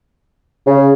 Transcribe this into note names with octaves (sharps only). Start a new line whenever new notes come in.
C#3